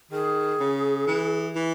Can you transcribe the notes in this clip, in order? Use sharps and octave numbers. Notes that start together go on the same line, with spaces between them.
D#3 G#4
C#3
E3
E3